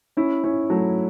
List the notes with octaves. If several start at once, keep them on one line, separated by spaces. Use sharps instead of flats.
C#4 E4
C#4 E4
F#3 A3